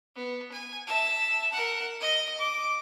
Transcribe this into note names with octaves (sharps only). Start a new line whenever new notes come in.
B3
G#5
E5 A5
A#4 F#5
D#5 D#6
D6